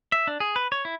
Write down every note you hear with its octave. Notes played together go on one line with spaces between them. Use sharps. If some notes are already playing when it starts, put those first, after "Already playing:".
E5
D4
G#4
B4
C#5
E4